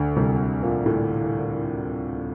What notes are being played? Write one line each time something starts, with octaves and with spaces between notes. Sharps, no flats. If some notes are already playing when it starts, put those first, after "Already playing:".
Already playing: D2 D3
C2 C3
A#2
A2